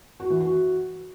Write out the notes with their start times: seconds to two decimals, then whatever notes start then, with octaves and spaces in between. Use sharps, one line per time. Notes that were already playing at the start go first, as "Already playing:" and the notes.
0.20 F#4
0.30 E3
0.41 F#4